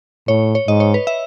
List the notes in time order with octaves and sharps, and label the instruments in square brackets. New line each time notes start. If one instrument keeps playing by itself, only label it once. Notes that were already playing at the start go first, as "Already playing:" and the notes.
[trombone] A2 [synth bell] C#5
[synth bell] C#5
[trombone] G#2 [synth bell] D#5
[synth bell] C#5
B4
E5